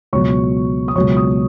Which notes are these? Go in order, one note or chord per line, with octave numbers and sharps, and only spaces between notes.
C#2 B2 F#3 C#5 C#6
D#6
C#2 B2 F#3 C#5 C#6
D#6